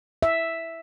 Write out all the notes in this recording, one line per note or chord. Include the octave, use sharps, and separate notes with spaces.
E5